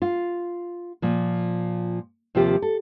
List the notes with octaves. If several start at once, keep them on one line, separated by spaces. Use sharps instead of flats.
F4
A#2 F3
D#2 C3 F3 F4 G4
A4